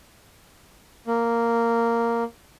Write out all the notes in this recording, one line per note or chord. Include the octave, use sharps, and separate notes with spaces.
A#3